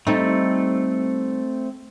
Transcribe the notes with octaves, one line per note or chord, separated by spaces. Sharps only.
G3 A3 C4 D#4 A4